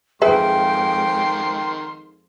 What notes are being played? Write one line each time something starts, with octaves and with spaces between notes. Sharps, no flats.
F2 D#3 G#3 G#4 B4 E5 G5 C6